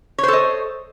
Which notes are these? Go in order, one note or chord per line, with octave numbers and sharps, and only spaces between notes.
A4 C5 C#5 D#5